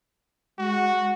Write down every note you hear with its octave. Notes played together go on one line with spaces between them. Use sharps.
G#3 F#4